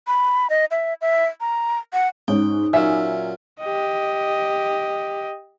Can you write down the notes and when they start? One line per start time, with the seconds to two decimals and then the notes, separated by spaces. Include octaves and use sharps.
0.07 B5
0.50 D#5
0.71 E5
1.01 E5
1.41 A#5
1.93 F#5
2.28 G#2 C#4 D#4 G5
2.73 A#2 F#3 C#4 E5 G#5
3.61 G4 D#5